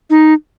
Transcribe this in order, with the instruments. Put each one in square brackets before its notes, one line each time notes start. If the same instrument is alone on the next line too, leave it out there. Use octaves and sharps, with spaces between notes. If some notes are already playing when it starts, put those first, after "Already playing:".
[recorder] D#4